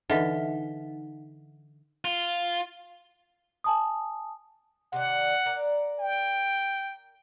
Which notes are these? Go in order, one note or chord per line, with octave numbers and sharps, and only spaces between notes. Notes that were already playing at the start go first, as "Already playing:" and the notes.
D3 E3 D#4 D#5 E5 F#5 B6
F4
G#5 A5 D#6
C3 D#3 D4 F#5
A#4 D5
G5